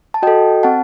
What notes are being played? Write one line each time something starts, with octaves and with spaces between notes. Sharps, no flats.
A5
F#4 A4 D#5 G5
C4 F#5 A5